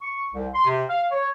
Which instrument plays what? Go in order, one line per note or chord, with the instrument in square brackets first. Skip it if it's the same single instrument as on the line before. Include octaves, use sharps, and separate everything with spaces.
[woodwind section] C#6
C2
C6
C3
F5
C#5